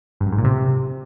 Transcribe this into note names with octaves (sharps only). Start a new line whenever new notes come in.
G2
F#2
G#2
A#2
C3